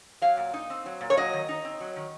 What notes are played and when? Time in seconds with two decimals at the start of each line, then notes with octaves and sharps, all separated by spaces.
0.22 F#3 F5
0.37 A#2
0.54 D#4
0.70 C4
0.86 F#3
1.01 A#2
1.10 C#5
1.17 F#3 D#5
1.33 D#3
1.49 D#4
1.65 C4
1.80 F#3
1.96 D#3